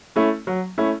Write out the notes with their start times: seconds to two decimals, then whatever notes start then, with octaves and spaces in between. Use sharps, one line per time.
0.16 A3 C#4 E4
0.47 F#3
0.78 A3 C#4 E4